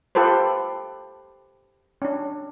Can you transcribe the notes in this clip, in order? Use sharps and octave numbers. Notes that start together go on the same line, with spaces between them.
F4 G4 A4 B4 C5
C#4 D4